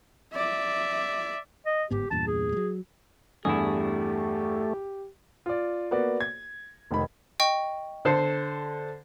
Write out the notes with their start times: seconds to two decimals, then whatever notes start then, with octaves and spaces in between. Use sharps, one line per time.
0.34 D5 E5
1.66 D#5
1.91 G1 G#2 B3 G4
2.11 E2 G2 A#2 A5
2.27 G#4
2.52 F#3 G3
3.45 E2 G2 A3 E4 G4 G#4
5.46 F4 D5
5.91 A#3 B3 F#4 D5
6.20 G#6
6.91 F1 D#3 B5
7.40 D#5 G5 C#6
8.05 D3 A4 C5